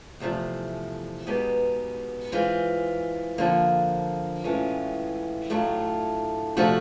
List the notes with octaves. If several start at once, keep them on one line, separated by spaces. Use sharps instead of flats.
E2 C3 F3 A3
B2 G#3 B3 D#4 G4
E3 G#3 C4 F4
F2 D3 F3 A#3
A2 E3 G#3 C#4 F4
A2 F#3 A3 D4 F4
C3 F3 A3 D4 F#4